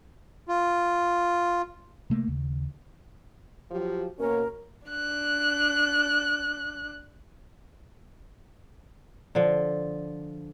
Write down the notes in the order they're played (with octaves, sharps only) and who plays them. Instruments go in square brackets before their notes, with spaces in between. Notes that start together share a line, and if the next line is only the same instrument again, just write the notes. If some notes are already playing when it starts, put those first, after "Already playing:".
[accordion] F4
[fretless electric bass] C3 A3 A#3
D#2 C#3
[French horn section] F3 F#3 G4
[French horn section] B2 A#3 C#4 [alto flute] A#4
[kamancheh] D4 F#6
[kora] D3 F3